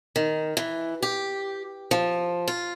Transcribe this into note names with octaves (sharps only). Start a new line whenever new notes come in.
D#3
E3
G4
F3
F4